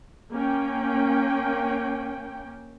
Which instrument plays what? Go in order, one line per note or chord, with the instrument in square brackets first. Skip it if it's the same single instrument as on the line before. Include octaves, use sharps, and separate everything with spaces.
[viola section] A#3 C#4 G5